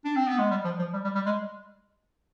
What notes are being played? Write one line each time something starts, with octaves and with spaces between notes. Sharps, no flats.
D4
C4
B3
G#3
G3
F3
F3
G3
G3
G3
G#3